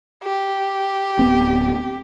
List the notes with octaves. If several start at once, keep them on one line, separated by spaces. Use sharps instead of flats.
G4
D1 B3 C4